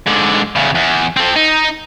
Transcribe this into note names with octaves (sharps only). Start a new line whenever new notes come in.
G#2 D3
E2 C#3
E2
C4 A4
D#4